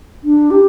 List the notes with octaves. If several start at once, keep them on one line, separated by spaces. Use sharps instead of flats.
D4
G4